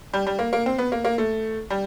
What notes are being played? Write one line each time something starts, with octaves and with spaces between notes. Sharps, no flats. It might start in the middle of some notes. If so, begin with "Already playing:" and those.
G3
G3
A#3
A#3
C4
B3
A#3
A#3
A3
G3